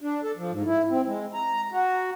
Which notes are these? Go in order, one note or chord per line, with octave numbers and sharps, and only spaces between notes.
D4
A4
F3
G#2
E4
C4
G#3
A#5
F#4